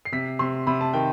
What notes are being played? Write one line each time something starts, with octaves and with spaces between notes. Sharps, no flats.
C7
C3 B6
C3 C6
C3 B5
A5
D#3 G5